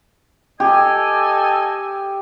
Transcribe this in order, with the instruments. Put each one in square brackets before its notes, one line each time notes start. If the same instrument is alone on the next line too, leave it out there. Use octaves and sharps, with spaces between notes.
[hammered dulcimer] G4 [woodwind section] A4 D#5 G#5